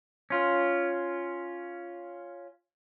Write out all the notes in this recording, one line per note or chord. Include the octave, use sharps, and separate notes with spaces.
C#4 F4